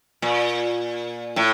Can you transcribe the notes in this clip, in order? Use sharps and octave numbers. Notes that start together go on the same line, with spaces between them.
A#2
A2